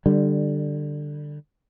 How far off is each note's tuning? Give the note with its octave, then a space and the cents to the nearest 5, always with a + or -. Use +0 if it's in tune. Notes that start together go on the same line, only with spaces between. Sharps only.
D3 +15 G3 +0